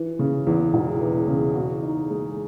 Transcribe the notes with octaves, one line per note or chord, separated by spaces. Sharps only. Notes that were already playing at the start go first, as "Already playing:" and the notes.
Already playing: E3
C#3
E2
E1
E3
C#3
F#4
D#4
G#3